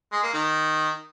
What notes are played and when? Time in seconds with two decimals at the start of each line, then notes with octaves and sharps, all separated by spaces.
0.12 G#3
0.23 A#3
0.34 D#3